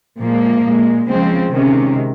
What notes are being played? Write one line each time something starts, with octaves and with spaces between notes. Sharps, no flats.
A#2 F3 G#3 A#3
A#2 G#3
C#3 F3 G#3 C4
C3 D#3 G#3 C#4